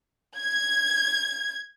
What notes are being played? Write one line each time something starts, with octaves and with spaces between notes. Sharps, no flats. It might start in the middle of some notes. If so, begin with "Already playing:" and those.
G#6